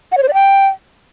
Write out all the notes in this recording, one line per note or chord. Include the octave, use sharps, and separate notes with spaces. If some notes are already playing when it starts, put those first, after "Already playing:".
F#5
C#5
C5
D5
G5